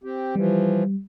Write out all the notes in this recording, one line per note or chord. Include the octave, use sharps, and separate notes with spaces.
C4 G4
E3 F3 G3